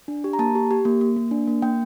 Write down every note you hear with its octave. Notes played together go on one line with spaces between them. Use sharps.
D4
G4
A#5
A#3 A5
G4
G4
A#3
A#3
A#3
D4
A#3
A#3 G5